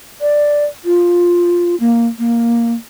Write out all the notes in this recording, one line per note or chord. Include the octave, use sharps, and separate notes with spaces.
D5
F4
A#3
A#3